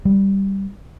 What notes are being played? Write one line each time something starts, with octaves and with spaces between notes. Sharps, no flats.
G3